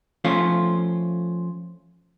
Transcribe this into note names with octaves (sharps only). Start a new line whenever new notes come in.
F3 A3 C#4 F4